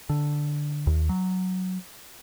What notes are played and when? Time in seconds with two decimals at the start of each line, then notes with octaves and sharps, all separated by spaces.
0.09 D3
0.87 D#2
1.09 F#3